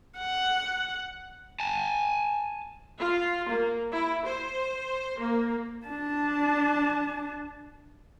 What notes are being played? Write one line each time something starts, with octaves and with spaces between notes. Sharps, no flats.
F#5
G#5 A5
F4
A#3
E4
C5
A#3
D4 A5